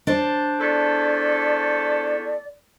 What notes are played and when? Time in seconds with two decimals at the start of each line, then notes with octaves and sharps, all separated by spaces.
0.07 D4 C5
0.60 E2 A3 A4 D5